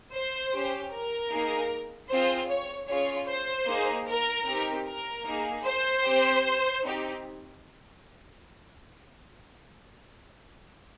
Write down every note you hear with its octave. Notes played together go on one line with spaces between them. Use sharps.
C5
C#4 G4
A#4
A#3 D#4 G#4
C4 F4 G#4 C5
C#5
C#4 F4 G#4 C#5
C5
A#3 D#4 G#4
A#4
C4 D#4 G4
A#4
A#3 D#4 G#4
C5
C4 G4
C4 D#4 G4